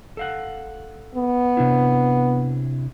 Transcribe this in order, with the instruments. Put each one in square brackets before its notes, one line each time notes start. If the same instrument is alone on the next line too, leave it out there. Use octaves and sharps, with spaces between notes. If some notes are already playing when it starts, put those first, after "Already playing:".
[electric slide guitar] A4 F5 F#5
[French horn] B3
[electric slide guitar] C3 D4 E4